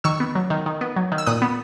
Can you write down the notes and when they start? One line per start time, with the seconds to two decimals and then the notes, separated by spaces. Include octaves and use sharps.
0.04 D#3 C#6 E6
0.20 B3
0.35 F#3
0.50 D#3
0.66 D#3
0.81 B3
0.96 F#3
1.12 D#3
1.18 E6
1.26 A#2 D#6 F#6
1.42 B3